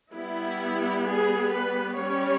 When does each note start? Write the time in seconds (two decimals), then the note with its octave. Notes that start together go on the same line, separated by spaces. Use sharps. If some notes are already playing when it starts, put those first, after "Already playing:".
0.12 G3 B3 E4
1.05 G#4
1.52 B4
1.98 G3 C#4 C#5